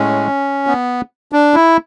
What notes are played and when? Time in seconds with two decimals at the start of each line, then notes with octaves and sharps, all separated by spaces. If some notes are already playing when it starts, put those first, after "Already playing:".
Already playing: A2 G#3 C#4
0.67 B3
1.32 D4
1.54 E4